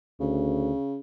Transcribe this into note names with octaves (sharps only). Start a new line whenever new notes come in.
D2 C#3